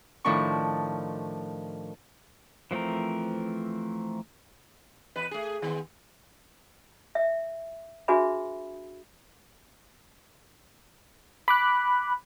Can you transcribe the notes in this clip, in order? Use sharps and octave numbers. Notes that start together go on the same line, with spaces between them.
A2 D#3 F3 D4 C#6
E3 F3 A3 C4 A#4
E2 B4
A3 G#4
D#3 B3
E5
D4 F#4 G#4 B4 E5 B5
B5 D6 F#6